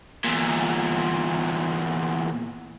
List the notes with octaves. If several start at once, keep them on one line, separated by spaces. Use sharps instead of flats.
E2 A#2